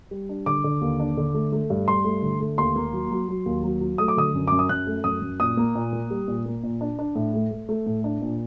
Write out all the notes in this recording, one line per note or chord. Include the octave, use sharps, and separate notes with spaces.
G3
D4
D3 D6
D3
D#2
D4
D3
A3
A3
G2
G2 C6
A3
D3
A3
D#2 C6
A#3
F#3
F#3
F#3
D#2
F#3
F#3
A3 D#6
D6
D3 D#6
F#2
F#2 D6
D#6
F#2 F#6
A3
F#2 D#6
F#2
A#2 D#6
A#3
A#2
A#3
G3
A#2
A#3
A#2
D4
D4
A2
A3
A3
A3
A2
D4
A#2